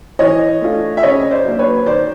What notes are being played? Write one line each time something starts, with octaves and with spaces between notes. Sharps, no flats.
E3 C#5 D#5
A3 D4 F4
E5
C#3 C#5 D#5
C5 D5
F#3 A#3 D4
B4 C#5
D#3 C5 D5